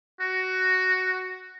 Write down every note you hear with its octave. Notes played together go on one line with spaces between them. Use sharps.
F#4